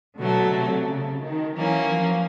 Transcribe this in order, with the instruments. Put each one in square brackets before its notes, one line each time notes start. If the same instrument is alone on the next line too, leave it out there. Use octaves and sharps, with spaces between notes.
[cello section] B2 [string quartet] D3 F#3 A3
[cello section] C3
C#3
D#3
[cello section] E3 [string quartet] F#3 A#3 C#4
[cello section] F3